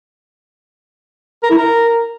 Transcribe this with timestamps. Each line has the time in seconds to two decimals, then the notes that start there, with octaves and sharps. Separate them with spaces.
1.43 A#4
1.50 E4
1.58 A#4